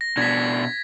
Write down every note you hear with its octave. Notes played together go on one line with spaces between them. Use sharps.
A#6
B2 D4 G#6 B6